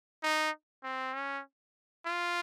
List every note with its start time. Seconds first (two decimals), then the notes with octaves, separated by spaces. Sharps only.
0.23 D#4
0.84 C4
1.14 C#4
2.06 F4